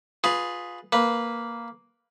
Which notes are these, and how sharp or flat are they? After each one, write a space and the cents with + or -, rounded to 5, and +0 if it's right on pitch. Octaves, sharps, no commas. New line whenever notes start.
F4 +20 G#4 +0 B4 +0
A#3 +0 B4 -5